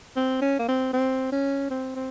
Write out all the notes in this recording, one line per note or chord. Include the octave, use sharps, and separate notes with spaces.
C4
C#4
A#3
C4
C4
C#4
C4
C4